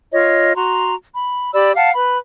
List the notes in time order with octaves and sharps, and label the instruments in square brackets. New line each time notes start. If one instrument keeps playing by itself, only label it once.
[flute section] F4 C#5 D#5
F#4 A#5 C6
B5
G4 D5 B5 E6
F5 F#5 A5
B4 B5